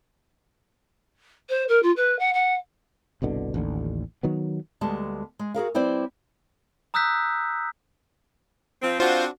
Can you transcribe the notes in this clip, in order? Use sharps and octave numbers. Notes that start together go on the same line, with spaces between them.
C5
A#4
F4
B4
F#5
F#5
G1 C2 B2 D3
A1 D#2 D3
D#3 F#3 B3
D2 G3 G#3 B3 A5
G#3
F#4 G#4 A#4 F5
G3 C4 E4 B4 C5 D5
A#5 D#6 E6 F#6 G6 B6
F3 C4
C4 D4 F4 F#4 C5